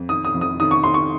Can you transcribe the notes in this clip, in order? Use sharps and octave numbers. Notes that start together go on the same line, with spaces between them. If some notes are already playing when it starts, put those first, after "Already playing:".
Already playing: F2
D#3 D#6
D#6
F2
D#6
D#3 D#6
C#6
D#3 C6
C#6